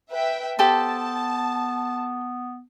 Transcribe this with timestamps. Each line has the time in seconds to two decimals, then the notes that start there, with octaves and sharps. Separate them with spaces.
0.12 B4 E5 G5
0.59 B3 G4 A4 C5 A5